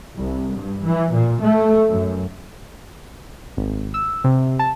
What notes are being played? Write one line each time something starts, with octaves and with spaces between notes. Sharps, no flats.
C2
G2
E3
A#2
A3
F#2
G#1
E6
C3
A5